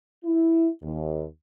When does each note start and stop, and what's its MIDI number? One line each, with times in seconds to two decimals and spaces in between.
0.24 0.68 64
0.83 1.24 39